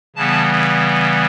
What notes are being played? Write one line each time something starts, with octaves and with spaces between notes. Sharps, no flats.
C#3 E3 G3 B3 A5